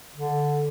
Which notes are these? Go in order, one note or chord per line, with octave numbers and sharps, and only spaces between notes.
D3